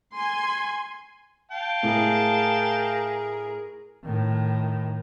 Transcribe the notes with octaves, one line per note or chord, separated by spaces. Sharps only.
G#5 C6
F5 G5 A5
A2 G#4 A#4
A2 D#3